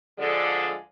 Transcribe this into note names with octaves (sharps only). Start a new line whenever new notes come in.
D2 D3 F3 G#3 A4 D5